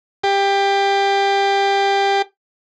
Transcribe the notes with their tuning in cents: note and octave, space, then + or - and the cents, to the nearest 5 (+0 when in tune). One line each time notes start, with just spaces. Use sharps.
G4 +20